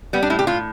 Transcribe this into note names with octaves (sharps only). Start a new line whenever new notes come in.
G3 B3
D4
A2 E4
G4
A2 F4